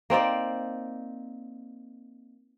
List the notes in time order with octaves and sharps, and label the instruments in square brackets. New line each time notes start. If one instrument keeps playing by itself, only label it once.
[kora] A#3 C4 D#4 D5